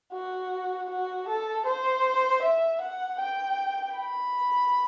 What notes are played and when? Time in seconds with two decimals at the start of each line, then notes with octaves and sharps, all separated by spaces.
0.13 F#4
0.89 F#4
1.28 A4
1.66 C5
2.43 E5
2.81 F#5
3.20 G5
3.96 B5